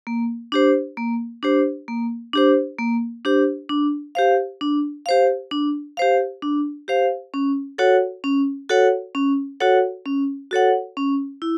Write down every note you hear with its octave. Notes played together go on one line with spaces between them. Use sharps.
A#3
D4 G4 C5
A#3
D4 G4 C5
A#3
D4 G4 C5
A#3
D4 G4 C5
D4
G4 C5 F5
D4
G4 C5 F5
D4
G4 C5 F5
D4
G4 C5 F5
C#4
F#4 A4 C#5 F#5
C#4
F#4 A4 C#5 F#5
C#4
F#4 A4 C#5 F#5
C#4
F#4 A4 C#5 F#5
C#4
E4